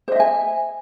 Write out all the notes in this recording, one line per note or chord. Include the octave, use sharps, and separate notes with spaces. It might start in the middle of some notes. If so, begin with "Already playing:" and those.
C5 D#5 E5 G#5